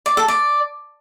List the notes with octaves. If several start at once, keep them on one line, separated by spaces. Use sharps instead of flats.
D5
A4
D5